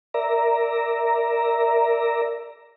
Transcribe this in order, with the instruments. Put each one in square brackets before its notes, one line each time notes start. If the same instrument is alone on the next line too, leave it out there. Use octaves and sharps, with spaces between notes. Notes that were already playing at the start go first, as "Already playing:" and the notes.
[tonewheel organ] A#4 D5 E5 A#5